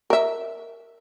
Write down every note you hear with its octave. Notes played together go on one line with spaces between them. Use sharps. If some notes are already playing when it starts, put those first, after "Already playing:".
A#4 E5